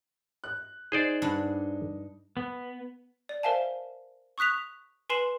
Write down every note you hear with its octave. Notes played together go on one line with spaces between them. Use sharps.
F#6
D#4 G#4 C5 D5
G2 D4 F#5
B3
D5
A#4 C5 E5 F5 G#5 A5
C#6 D#6 F#6 B6 F7
B4 G#5 C6 C7 E7 F#7